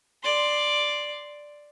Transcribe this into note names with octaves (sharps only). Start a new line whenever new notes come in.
D5 C6